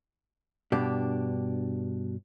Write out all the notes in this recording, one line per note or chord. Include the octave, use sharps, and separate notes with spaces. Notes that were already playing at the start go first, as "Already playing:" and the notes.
G2 B2 D4 G4